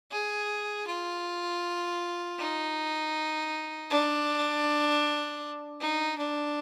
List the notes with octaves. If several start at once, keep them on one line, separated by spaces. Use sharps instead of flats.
G#4
F4
D#4
D4
D#4
D4